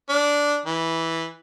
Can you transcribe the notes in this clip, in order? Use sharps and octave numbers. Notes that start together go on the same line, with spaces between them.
D4
E3